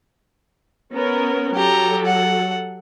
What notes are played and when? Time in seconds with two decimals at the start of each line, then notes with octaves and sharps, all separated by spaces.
0.92 B3 C#4 A#4
1.55 F#3 G4 A4 A#5
2.06 F#5